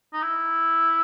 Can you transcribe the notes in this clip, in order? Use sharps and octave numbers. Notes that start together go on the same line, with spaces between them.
D#4
E4